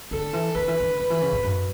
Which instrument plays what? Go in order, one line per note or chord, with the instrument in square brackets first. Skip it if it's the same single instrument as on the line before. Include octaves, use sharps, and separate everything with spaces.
[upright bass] D3 [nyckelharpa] A4
[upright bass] E3
[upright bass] D3 [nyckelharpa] B4
[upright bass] E3
D3
[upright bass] D3 [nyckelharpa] B4
[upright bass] E3
C#3
A2
F#2